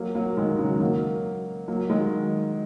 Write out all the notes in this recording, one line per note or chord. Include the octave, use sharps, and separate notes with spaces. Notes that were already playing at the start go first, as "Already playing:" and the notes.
Already playing: F#3 A#3
F#3 A#3
D#3 G#3
C#3 F#3
F#3 A#3
F#3 A#3
D#3 G#3